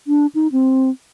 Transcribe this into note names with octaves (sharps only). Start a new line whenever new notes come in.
D4
D#4
C4